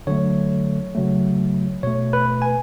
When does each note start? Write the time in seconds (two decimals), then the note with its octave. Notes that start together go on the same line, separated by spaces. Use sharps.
0.07 D3 F#3 A3 C#5
0.95 C#3 F#3 A3
1.83 B2 A3 C#5
2.13 B4
2.42 G#5